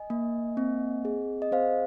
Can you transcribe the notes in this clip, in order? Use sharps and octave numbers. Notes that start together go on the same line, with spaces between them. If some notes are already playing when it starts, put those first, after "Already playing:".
Already playing: D#5 G#5
A#3
C4
G#4
D#5
C4 C5 F5